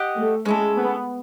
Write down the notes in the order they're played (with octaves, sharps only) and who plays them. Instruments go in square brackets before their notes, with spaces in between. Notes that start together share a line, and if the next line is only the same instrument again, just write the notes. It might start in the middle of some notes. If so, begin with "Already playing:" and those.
Already playing: [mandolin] G4 D#5 F#5
[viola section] A3
[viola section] G#3 [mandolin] C#4 E4 A4
[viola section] B3